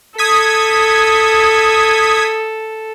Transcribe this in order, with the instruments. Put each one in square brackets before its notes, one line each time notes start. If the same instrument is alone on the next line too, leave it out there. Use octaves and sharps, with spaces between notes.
[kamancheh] A4 [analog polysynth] D#6 G#6 B6